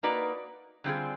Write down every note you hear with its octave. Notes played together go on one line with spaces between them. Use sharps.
A#3 D#4 F#4 B4 D5
D3 G3 C4 F4 G#4